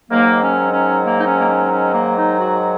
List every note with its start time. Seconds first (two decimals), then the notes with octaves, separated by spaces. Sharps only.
0.10 G#2 D#3 F#3 A#3
0.42 C#4
0.72 C#4
1.03 A#3
1.18 D#4
1.25 C#4
1.37 A#3
1.48 C#4
1.71 C#4
1.94 A#3
2.17 D#4
2.40 F#4